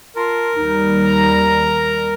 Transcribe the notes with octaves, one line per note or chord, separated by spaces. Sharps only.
F4 A#4 A5 C6
D#2 G3 D#4
A#5